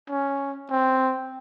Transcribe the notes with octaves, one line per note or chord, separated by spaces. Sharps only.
C#4
C4